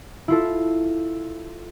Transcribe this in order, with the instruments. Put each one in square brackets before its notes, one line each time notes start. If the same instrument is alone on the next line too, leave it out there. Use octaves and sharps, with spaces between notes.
[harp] E4 F4 A4